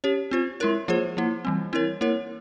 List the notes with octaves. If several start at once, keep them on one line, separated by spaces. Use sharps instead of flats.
C#4 G4 C#5
C4 F4 C5
G#3 E4 A#4 C#5
F3 A#3 F4 G#4 C5
F3 A#3 E4
E3 G3 C4
C4 E4 A#4 C#5
A#3 E4 A#4 C#5